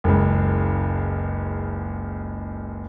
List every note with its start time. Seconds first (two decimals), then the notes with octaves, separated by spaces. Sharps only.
0.04 F#1 C#2